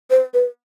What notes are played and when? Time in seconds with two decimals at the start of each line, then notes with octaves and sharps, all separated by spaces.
0.10 C5
0.34 B4